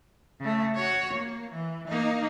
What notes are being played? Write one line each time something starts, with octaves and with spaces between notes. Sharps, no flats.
C#3 A3
F#4 C#5
A#3
E3
A#3 D#4